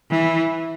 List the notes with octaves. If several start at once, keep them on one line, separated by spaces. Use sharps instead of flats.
E3